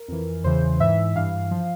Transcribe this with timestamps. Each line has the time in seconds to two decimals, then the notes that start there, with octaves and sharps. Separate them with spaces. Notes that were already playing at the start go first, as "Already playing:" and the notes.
Already playing: A#4
0.08 F2 E3
0.44 E2 C#3 E3 C5
0.80 G#2 E3 E5
1.15 G2 E3 F5
1.51 F3